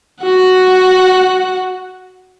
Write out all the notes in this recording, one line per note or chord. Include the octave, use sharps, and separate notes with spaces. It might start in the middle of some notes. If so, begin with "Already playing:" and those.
F#4 F#5